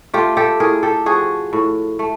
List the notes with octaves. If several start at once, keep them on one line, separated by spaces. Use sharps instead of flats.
A3 F4 G4
G4 A4
A2 G#4 A#4
G4 A4
F3 F#4 G#4
A2
A3